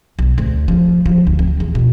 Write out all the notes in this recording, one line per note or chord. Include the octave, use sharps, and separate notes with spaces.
B1
D2
F3
F3
D2
C4
E2
B2